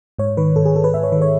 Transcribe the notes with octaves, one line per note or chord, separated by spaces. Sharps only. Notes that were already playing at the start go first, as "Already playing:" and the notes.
G#2 C#5
D#3 B4
G#2 A4
G#4
G#2 A4
B4
G#2 E5
C#5
D#3 B4
C#5